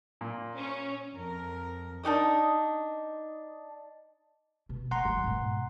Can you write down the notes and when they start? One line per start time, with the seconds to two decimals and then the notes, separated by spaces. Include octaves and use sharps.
0.21 A#2
0.57 C#4
1.14 F2 A#4
2.03 D4 D#4 G4 D#5
4.69 B2
4.91 E3 F#5 A#5 C6
5.05 G#2 F#3
5.24 G#2 B2